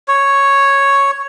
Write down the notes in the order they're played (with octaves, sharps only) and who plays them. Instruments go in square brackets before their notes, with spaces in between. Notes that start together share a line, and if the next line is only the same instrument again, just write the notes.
[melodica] C#5